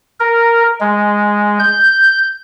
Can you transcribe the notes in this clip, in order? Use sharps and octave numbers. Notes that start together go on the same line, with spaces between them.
A#4
G#3
G6